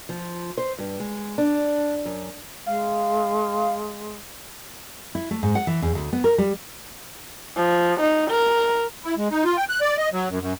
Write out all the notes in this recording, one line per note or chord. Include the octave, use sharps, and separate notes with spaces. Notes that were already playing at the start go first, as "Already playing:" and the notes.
F3
C5
G2
G#3
D4
F#2
G#3 F5
E4
A3
G#2
F#5
E3
E2
D2
B3
A#4
G3
F3
D#4
A#4
E4
G#3
D#4
F4
G5
F#6
D5
D#5
F#3
F#2
F#2